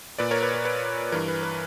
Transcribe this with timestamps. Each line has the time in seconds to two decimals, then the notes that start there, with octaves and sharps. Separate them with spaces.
0.18 A#2 B4 D5
0.31 A#4 C#5
0.43 B4
0.54 A#4
0.65 B4
1.12 G2 E3 A#4
1.28 B4
1.43 B4